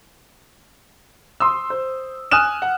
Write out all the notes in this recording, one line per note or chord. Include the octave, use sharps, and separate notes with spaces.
C6 D#6 E6
C5
G#5 D#6 F6 F#6 E7
F#5